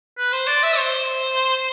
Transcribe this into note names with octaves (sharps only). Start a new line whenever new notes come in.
B4
C5
D5
E5
C5